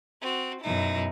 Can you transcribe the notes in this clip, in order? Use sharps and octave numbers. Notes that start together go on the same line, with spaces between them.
C4 F#4
F#2 B2 D#4 E4